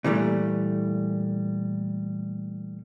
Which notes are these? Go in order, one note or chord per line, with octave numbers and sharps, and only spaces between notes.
A#2 E3 G3 A3